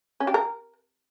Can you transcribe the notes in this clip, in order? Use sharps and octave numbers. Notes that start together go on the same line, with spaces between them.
C#4
G4
A#4